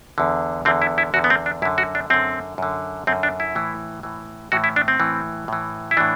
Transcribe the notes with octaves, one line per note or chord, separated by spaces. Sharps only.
E2 D3
E2 D3 C4
E4
E4
E2 D3 F#4
B3
C4
D4
F#2 D3 E4
F#4
D4
F#2 D3 C4
F#2 D3
F#2 D3 C4
D4
E4
A2 E3
A2 E3
A2 E3 F#4
E4
D4
C4
A2 E3
A2 E3
E4
A2 E3 D4